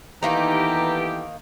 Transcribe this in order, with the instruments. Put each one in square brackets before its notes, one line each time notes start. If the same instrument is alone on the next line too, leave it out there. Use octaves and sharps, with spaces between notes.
[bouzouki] D#3 A#3 D#4 [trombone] E3 [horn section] B3 G4 A4 [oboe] A#5